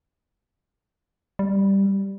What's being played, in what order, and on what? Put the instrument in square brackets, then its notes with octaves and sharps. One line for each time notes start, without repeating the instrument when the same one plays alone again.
[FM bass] G3